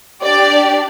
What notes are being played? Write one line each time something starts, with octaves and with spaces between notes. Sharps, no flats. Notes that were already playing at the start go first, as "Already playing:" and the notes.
D4 G4 D5